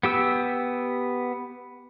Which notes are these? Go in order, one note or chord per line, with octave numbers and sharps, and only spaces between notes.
B3 G4 E6